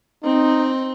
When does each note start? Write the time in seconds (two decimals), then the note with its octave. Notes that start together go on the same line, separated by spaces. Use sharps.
0.24 C4 D#4